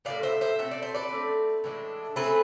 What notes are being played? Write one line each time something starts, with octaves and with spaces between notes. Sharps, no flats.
A2 F3 B3 D5 F5
C5 E5
C5 E5
B2 A3 C4 E5
D5
C5
B4 D5
D3 A3 C4
A2 E3 G#3 D4
E3 A3 C4 G#4 B4